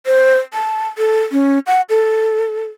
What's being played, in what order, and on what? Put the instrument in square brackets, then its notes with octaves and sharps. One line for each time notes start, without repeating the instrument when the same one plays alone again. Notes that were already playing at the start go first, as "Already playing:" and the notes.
[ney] C5
A5
A4
C#4
F#5
A4